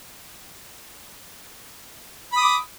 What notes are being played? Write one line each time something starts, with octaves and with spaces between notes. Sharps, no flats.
B5 D6 D#6